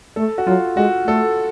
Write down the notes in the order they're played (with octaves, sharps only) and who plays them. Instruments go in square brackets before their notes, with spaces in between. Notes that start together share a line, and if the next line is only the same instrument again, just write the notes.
[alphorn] A3 [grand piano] A4
[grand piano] F#4
[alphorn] F#3 [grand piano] F4
[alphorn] G#3 [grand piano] F#4
[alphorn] A3 [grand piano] A4